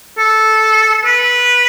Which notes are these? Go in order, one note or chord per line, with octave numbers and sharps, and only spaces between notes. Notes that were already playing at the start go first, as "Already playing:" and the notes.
A4
B4